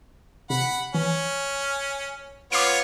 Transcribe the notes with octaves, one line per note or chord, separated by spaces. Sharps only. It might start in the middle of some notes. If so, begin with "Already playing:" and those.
C3 F#5 B5
E3 C#4
B3 F4 C#5 D6 C7 C#7